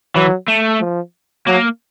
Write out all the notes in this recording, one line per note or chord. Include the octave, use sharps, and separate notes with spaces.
E3 F#3
A3
F3
F#3 A#3